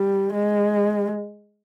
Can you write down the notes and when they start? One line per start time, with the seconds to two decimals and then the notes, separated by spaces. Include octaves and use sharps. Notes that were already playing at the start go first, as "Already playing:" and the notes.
Already playing: G3
0.33 G#3